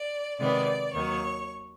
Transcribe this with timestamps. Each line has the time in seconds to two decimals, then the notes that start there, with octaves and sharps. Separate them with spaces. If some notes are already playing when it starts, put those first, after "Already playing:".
Already playing: D5
0.39 C3 D#3 G#3 B3 D5
0.93 D#2 D#3 F#3 C#5